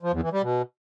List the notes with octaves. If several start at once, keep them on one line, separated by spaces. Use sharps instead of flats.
F3
E2
E3
G3
B2